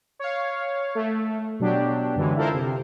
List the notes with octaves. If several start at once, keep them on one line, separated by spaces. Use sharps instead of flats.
C#5 F5
A3
B2 F#3 D4 G4
F#2 D3 E3 G#3
E4 F4 A4 A#4 C5
C3